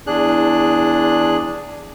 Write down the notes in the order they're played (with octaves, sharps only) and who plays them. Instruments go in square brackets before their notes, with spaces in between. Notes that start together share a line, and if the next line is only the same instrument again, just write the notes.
[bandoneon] E2 D4 G#4 F#6